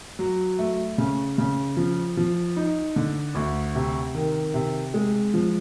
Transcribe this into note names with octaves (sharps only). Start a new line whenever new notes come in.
F#3
A3
C#3
C#3
F3
F3
D#4
D3
D2
C3
D#3
C3
G#3
F3